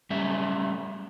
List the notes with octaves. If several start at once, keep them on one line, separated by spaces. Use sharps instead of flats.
G3 A3 C#4 E5